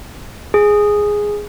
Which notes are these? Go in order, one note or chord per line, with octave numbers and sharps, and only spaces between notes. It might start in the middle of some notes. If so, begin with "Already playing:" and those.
G#4